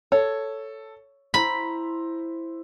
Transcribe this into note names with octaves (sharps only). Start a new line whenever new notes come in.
A4 C#5
E4 C5 A#5 B5